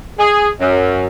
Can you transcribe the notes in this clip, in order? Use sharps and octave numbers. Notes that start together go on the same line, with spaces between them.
G#4
F#2